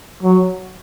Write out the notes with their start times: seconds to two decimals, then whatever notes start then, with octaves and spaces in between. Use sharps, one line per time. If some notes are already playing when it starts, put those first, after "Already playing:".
0.23 F#3